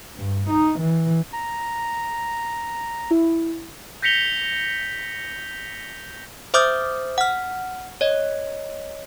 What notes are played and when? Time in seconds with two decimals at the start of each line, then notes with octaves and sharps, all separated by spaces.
0.16 G2
0.50 D#4
0.80 E3
1.33 A#5
3.11 E4
4.02 G6 A#6 B6 C#7 F7 G7
6.54 C5 E5 D6 D#6 F6 G6
7.18 F#5 F6
8.01 C#5 D#5